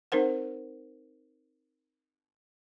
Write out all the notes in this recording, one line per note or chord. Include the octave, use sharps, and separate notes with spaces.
C4 D#4 A#4 C5 F#5